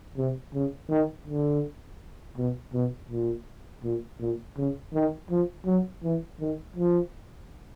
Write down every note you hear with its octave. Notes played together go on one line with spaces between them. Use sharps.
C3
C#3
D#3
D3
B2
B2
A#2
A#2
A#2
C#3
D#3
F3
F#3
E3
D#3
F3